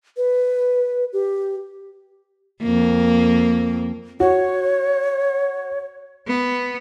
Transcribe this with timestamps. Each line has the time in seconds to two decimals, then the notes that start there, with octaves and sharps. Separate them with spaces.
0.17 B4
1.13 G4
2.62 F2 A#3
4.20 F#4 C#5
6.27 B3